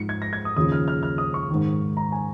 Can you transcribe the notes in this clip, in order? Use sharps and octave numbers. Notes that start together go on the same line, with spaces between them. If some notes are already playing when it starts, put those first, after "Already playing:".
Already playing: G#2 F3 C#7
G#6
A#6
G#6
D#6
D#2 C#3 F3 D#6
F6
F6
F6
D#6
C#6
G#2 D#3
A#5
G#5